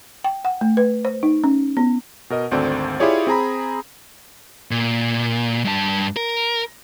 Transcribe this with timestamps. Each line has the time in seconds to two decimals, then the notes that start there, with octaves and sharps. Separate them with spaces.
0.24 G5
0.45 F#5
0.61 A3
0.77 B4
1.05 C5
1.23 D#4
1.44 C#4
1.77 B3
2.30 B2 A#4 D#5
2.51 G#1 D2 C4 A4 D5
3.00 E4 F4 G4 G#4 C#5 D5
3.27 C4 G#4 A#5 B5
4.71 A#2
5.65 G2 A5
6.16 A#4